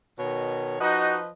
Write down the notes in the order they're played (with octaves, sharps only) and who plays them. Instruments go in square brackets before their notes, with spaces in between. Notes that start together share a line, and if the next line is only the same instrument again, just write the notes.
[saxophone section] B2 D#3 C#5
[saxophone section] F3 B4 D#5 [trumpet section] D#4 F#4